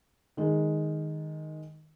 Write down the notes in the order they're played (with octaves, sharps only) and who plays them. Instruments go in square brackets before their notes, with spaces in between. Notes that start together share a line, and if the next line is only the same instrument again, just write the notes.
[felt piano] D#3 G#3